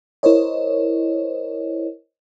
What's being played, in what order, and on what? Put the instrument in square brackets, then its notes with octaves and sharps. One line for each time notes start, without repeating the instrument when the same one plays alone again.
[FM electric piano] E4 A#4 C5 C#5 D#5